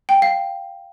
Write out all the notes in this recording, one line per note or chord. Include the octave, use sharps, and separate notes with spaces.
G5
F5